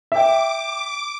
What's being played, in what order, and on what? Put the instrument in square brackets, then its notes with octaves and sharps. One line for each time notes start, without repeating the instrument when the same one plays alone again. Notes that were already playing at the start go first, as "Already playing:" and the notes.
[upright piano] E5 G5 [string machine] D6